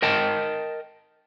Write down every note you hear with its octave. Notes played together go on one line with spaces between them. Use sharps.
A#4 D#5 G5 A5